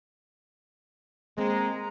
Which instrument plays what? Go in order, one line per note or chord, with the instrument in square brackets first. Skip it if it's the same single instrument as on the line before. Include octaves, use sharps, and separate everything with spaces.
[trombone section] G#3 [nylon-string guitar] A#3 C4 [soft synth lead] A#5